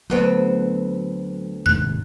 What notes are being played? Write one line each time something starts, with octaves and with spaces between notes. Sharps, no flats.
D2 F#3 B3 C4
D#1 G#2 C3 F#6